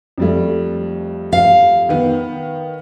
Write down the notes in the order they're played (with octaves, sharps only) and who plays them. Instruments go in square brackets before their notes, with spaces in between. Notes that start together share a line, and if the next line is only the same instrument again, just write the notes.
[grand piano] F2 G3 A3
[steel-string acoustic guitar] F5
[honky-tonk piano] D#3 B3